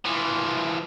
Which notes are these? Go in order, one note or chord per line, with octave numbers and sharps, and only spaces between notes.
E3 F3